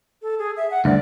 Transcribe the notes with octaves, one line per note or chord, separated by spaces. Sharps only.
A4
G#4
E5
F#5
D2 G2 D5